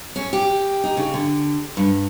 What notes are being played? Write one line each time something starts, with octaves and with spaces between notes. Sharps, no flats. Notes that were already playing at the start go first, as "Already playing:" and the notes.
C#4
G4
D#4
C#3
D3
G2